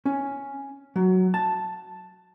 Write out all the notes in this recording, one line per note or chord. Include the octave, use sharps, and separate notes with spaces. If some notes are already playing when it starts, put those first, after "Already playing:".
C#4
F#3
A5